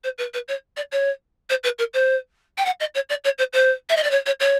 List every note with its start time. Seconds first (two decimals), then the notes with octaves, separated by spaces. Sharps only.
0.04 C5
0.18 B4
0.33 B4
0.48 C#5
0.76 D5
0.91 C#5
1.49 C5
1.63 B4
1.78 A#4
1.93 C5
2.57 G5
2.65 F#5
2.80 D#5
2.94 C#5
3.09 D5
3.24 C#5
3.38 C5
3.53 C5
3.89 E5
3.96 D#5
4.03 D5
4.10 C#5
4.26 C#5
4.40 C#5